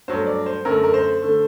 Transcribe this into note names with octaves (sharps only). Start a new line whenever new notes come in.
G2 F#3 A3 C5
D5
C5
F#2 D3 A3 A#4
A#4
C5
D3 A3